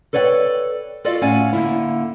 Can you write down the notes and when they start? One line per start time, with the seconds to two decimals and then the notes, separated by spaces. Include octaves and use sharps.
0.13 A4 B4 C#5 D5 F#5 G5
1.04 F4 F#4 A4 D5 D#5 F5
1.21 A2 C#4 D5 F5 F#5 G#5
1.53 D3 A#3 E4